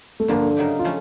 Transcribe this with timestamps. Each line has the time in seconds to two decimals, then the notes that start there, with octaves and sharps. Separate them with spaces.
0.20 A3
0.28 G2 D3 F3 A#3
0.57 C#3 F#3 A#3 D#4 G4
0.79 F4
0.85 F3 A3 C#4